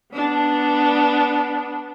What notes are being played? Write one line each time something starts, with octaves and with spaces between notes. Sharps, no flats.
B3 D4